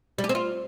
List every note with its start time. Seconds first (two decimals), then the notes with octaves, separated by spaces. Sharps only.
0.18 G3
0.24 G4
0.29 C4
0.35 F4